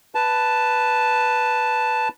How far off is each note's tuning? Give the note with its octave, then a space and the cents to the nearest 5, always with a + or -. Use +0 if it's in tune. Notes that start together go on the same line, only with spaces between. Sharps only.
B4 +0 A5 +0